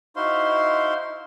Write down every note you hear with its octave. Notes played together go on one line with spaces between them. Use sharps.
D#4 E4 F#4 C5 F5 C6